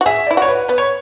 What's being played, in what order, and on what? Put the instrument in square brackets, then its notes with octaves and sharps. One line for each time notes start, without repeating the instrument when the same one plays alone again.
[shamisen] F#4
[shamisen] G#4 [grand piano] E5
[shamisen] E4 [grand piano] D5
[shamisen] F#4 [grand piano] C#5
[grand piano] B4
[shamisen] B3 [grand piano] B4
[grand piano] C#5